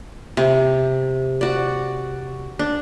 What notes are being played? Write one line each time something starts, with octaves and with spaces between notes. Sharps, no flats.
C3
F#4 D5
D4